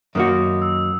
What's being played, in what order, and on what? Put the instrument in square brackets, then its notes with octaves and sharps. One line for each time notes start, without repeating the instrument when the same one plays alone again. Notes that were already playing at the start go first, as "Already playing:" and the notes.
[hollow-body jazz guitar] F#2 D#3 A#3 D#4 F#4 [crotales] D#6
[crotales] E6